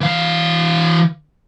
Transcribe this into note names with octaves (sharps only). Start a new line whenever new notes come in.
E3 F5